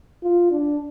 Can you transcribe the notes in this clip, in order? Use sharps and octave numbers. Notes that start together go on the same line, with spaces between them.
F4
D4